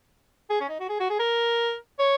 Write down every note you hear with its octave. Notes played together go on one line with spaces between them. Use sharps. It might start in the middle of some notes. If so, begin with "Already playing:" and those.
G#4
C#4
D#4
F#4
G#4
F#4
G#4
A#4
C#5